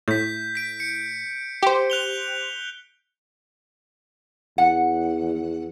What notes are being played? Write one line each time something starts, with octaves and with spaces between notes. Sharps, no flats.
A2 G6 B6
B6 D7
C#7
G4 C5
F#6 F7 G7
E2 F#5